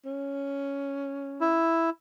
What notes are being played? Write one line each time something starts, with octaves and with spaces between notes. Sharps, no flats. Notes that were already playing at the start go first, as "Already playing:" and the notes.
C#4
E4